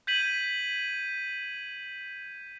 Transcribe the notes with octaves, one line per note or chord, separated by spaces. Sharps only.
G6 G#6 B6 D#7 F#7